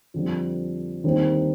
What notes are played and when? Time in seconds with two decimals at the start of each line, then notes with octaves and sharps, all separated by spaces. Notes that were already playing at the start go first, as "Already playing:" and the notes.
0.14 F2 D3 G3 C4
1.04 D#2 D3 G3 C4 D#4